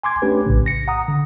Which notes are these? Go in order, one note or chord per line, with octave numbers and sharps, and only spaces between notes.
G#5 C6 D6 G#6
A3 C#4 D4 G4 B4
A#1 A2 C#3
A#6 C#7
F#5 A#5 D#6
D3